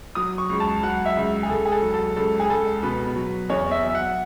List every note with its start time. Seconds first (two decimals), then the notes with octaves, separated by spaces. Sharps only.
0.15 F#3 D#6
0.38 C#6
0.50 C#2
0.60 A5
0.83 F#3 F#5
1.05 E5
1.17 C#2
1.43 G#4
1.49 C#2 A4
1.66 G#4
1.72 A4
1.82 F#3
1.94 A4
2.16 C#2 A4
2.40 G#4
2.49 C#2 A4
2.83 B2 B4
3.16 F#3
3.50 E2 C#5
3.71 E5
3.84 F#3
3.89 E5
3.95 F#5